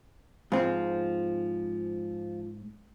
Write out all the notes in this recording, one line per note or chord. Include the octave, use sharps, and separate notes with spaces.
G#2 F3 C4